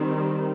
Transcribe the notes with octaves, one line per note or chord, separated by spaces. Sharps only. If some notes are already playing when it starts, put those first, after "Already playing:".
Already playing: D#3 G3 C4